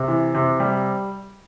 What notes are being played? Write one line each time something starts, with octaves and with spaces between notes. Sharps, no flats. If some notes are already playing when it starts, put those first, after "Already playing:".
Already playing: C3
E3
C3
G3